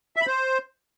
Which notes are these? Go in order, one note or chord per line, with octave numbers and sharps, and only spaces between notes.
E5
B5
C5